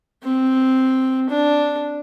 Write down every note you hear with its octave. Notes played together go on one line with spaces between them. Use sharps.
C4
D4